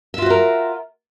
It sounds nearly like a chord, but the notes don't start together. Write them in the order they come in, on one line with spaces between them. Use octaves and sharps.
E5 F4 F#4 C5 A#4